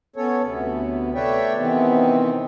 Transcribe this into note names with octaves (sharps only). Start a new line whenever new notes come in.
B3 C#4 A4 C#5
D2 C3 B3
A3 B4 C#5 D5 E5 G5
C3 D#3 E3 B3 C4